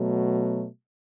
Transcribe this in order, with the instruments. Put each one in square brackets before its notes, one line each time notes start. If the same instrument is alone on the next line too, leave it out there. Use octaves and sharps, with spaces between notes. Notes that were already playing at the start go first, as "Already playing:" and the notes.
Already playing: [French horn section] B2 F#3 A3